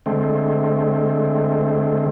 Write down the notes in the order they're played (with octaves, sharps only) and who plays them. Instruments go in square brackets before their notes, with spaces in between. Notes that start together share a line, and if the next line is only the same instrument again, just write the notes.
[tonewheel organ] D3 G#3 A3 C4